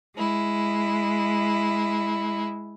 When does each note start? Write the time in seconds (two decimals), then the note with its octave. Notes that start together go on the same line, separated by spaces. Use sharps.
0.17 G#3 E4